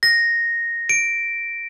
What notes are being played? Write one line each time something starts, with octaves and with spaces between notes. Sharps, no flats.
A#6
D7